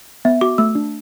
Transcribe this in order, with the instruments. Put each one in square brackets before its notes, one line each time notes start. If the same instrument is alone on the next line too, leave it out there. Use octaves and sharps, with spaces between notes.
[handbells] B3 [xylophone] E5
[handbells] F#4 [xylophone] D6
[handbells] A3 [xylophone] E6
[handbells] D4